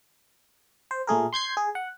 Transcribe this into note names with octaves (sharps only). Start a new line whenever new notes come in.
C5
A#2 A3 G#4 A#4
C6 G6 G#6 C7
G#4
F#5